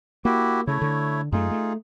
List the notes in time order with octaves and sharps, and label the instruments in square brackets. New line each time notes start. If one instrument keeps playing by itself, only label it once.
[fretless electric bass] A#3 [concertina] E4 F#4 G4
[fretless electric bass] C#3 [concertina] A3 E4 C#5
[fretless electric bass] D3
[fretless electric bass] F#2 A3 [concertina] D#4 F4 G#4
[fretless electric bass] A3